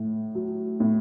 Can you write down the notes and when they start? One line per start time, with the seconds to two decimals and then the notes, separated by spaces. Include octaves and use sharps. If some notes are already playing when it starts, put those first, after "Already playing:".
Already playing: A2
0.35 F#3
0.80 A2